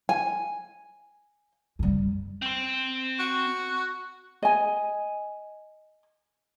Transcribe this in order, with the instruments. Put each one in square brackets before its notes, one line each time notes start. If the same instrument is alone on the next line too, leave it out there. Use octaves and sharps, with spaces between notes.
[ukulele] G#5
[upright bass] F#2 G3
[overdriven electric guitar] C4 C5
[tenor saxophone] F#4
[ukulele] D#5 G#5